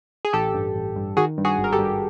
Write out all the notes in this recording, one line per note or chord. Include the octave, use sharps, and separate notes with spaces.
G#4
A1 G4 A4
G2
A1
G2
D#3 F#4 G#4
G2
F#4 G#4
G#1
A#4
G4 A4
G2